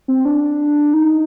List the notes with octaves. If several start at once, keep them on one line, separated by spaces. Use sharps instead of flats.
C4
D4
D#4